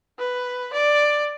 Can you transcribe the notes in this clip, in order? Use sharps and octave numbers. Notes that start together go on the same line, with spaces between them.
B4
D5